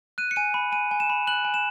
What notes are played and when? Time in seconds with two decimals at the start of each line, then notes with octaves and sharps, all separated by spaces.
0.18 F#6 D#7
0.31 C#7
0.36 G#5 D#7
0.54 B5
0.72 G#5 D#7
0.91 G#5
1.00 E7
1.10 B5
1.27 F#6 F#7
1.45 G#5
1.54 E7